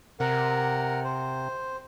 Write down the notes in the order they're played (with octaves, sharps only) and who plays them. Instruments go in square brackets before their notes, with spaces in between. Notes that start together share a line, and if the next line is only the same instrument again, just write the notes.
[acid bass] C3 [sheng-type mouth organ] A#4 F#5
[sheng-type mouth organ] C5